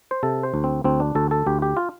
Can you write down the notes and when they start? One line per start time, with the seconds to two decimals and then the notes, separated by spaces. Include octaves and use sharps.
0.11 C5
0.23 C3 A4
0.43 C5
0.54 D2
0.64 C4
0.84 D2 C4
1.00 D4
1.15 D2 A4
1.31 A4
1.46 D2 G4
1.62 G4
1.77 F4